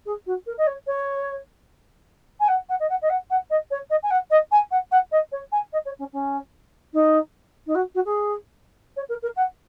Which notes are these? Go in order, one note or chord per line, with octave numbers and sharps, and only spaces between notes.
G#4
F#4
A#4
D#5
C#5
C#5
G#5
F#5
F#5
D#5
F#5
D#5
F#5
F#5
D#5
C#5
D#5
G#5
F#5
D#5
G#5
F#5
F#5
D#5
C#5
G#5
D#5
C#5
C#4
C#4
D#4
D#4
F#4
F#4
G#4
C#5
A#4
A#4
F#5